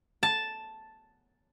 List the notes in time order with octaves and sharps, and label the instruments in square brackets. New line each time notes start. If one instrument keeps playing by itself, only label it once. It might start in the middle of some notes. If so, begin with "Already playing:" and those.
[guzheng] A5